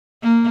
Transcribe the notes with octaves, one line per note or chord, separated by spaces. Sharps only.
A#3